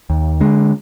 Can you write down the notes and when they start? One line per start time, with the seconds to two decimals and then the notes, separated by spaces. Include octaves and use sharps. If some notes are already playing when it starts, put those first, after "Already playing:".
0.10 D#2
0.41 D3 G#3